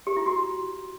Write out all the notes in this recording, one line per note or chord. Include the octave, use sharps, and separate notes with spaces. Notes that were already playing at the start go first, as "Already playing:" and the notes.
G4
E4
F#4